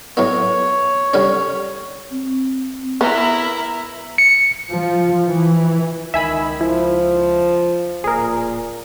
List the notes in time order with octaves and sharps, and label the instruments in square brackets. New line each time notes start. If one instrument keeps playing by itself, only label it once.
[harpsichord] A2 F#3 B3 [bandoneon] C#5
[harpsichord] D3 G3 C#4
[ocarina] C4
[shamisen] B3 [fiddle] E4 A#4 [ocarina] E5
[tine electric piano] C#7
[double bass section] F3
E3
[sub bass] C#2 [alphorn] D#3 [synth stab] E5 G#5 B5
[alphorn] F3 [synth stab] E4
[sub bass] D1 [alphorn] A#2 [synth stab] G#4 A#4